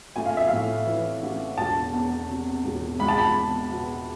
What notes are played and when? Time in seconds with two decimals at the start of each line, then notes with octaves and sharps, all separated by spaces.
0.16 A3 G#5
0.26 F5
0.37 E5
0.47 A2 F5
0.86 E3
1.22 A1
1.58 E1 A5
1.93 E2
2.29 C3
2.65 E1
2.99 G#3 B5
3.08 A5
3.18 B5
3.36 E2
3.71 B2